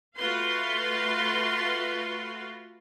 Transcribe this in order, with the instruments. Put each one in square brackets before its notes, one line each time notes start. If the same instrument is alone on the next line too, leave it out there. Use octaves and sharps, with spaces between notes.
[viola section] A3 F4 F#4 B4 F5 C6